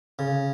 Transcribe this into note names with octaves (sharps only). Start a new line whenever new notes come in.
C#3